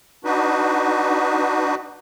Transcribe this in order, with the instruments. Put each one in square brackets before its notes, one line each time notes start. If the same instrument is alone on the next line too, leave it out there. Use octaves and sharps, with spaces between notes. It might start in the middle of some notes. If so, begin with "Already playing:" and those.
[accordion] D4 D#4 F#4 B4